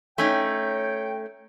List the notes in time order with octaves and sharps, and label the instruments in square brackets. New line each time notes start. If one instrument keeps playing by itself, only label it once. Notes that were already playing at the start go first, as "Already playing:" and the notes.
[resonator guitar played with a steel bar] A3 C#4 D#4 [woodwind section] C#5 G5